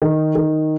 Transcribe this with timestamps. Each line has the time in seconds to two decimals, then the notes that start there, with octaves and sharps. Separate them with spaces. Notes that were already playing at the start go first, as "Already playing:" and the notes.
0.02 D#3
0.35 D#3